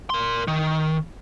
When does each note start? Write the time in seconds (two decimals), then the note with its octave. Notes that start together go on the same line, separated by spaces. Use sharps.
0.10 A#4 C6
0.48 D#3